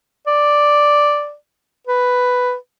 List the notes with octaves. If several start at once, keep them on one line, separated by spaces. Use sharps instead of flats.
D5
B4